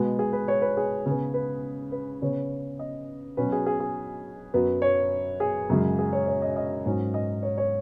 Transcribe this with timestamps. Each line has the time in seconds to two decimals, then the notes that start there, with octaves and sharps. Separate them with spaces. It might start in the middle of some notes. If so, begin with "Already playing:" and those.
Already playing: B2 G#3 B3
0.19 G#4
0.33 B4
0.48 C#5
0.62 B4
0.77 G#4
1.06 C#3 B3
1.34 B4
1.92 B4
2.22 C#3 B3 C#5
2.79 D#5
3.37 B2 F#3 C#4 B4
3.52 G#4
3.66 G#4
3.80 G#4
4.54 F#2 F#3 B3
4.82 C#5
5.40 G#4
5.70 F#2 C#3 G#3
5.99 G#4
6.13 C#5
6.27 C#5
6.42 D#5
6.56 D#5
6.86 G#2 F#3 C#4
7.14 D#5
7.43 C#5
7.58 C#5